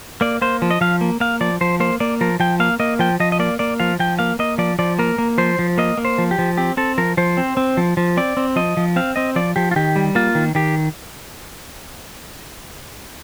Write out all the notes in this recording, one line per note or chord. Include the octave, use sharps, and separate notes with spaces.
A#3 D5
A#3 C5
F3
D#5
F3 F5
A#3
A#3 F5
F3 D5
F3 C5
A#3 C5
A#3 D5
F3 A#4
F3 G5
A#3 F5
A#3 D#5
F3 G5
F3 D#5
D#5
A#3 D5
A#3 D5
F3 F5
F3 G5
A#3 F5
A#3 D#5
F3 D5
F3 D5
A#3 A#4
A#3
F3 C5
F3
A#3 D#5
A#3
C5
F3
G4
F3
C4 G4
C4 A4
F3 A#4
F3 C5
C4
C4
F3
F3
C4 D5
C4
F3 D#5
F3
C4 F5
C4 D#5
F3 D5
F3 G4
F4
D#3 G4
G3
A#3 F4
D#3
D#3 G4